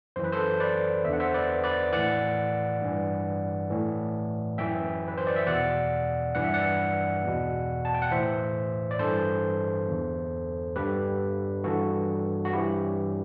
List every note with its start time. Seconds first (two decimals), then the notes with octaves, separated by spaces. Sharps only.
0.16 F#2 E3 C5
0.24 B4
0.33 A4 C5
0.60 B4 D5
1.04 E2 E5
1.09 D3 F#5
1.20 C5 E5
1.34 B4 D5
1.64 B4 D5
1.93 A2 E3 D5 F#5
2.82 G2 E3
3.70 A2 E3
4.58 F#2 E3 E5 G5
5.08 B4
5.18 C5
5.27 D5
5.36 E5
5.46 E2 B2 D5 F#5
6.35 G2 E3 F#5
6.44 E5
6.54 D5 F#5
7.24 E2 B2
7.85 A5
7.94 G5
8.02 F#5
8.11 A2 E3 C5 E5
8.91 D5
8.99 G2 E3 A4 C5
9.88 E2 D3
10.76 G2 D3 G4 B4
11.64 G2 E3 F#4 A4
12.45 F#4
12.53 G2 E3 E4 G4